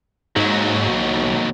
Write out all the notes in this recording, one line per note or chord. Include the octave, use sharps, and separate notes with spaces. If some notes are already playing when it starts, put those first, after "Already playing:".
D#2 G#2 F#3
B1